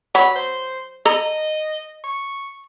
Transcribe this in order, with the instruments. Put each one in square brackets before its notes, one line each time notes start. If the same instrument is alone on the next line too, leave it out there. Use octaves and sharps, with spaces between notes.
[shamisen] F#3 [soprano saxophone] B5
[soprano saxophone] C5
[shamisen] A4 A#5 B5 [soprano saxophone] D#5
[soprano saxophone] C#6